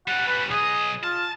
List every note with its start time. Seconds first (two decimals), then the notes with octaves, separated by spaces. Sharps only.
0.08 G3 C#4 F#5
0.28 B4
0.51 B1 G#4 D#5
1.04 F4 A5